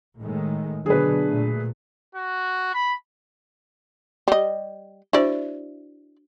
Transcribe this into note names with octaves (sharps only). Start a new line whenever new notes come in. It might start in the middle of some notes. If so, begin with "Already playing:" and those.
A2 D#3 G#3
B2 D3 F#3 D4 G#4 B4
A#2 A3
F#4
B5
G3 D#5
D4 E4 F#4 C5 D5